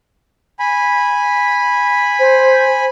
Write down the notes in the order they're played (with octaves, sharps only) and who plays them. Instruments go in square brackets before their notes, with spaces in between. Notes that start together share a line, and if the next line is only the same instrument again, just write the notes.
[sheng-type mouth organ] G#5 B5
[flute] C5